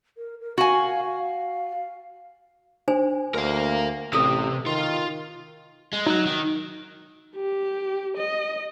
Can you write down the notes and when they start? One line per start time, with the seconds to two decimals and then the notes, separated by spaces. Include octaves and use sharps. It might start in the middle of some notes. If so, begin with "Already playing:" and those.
0.18 A#4
0.40 A#4
0.58 F#4 F5 G#5
1.04 F5
2.88 D4 C5 G#5
3.35 D2 A#4 F5
4.13 A1 C3 A4 E6
4.66 D#3 F4
5.93 G#3
6.07 F#3 D#4 F#6
6.27 D#3
7.36 G4
8.17 D#5